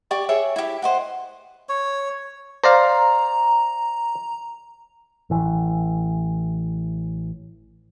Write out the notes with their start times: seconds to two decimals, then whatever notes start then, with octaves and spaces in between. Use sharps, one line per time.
0.11 G4 D5 C#6
0.29 G#4 C#5 E5
0.56 E4 G4
0.82 C5 D#5 F#5
1.69 C#5
2.64 C5 D5 F5 A#5
5.30 A1 E3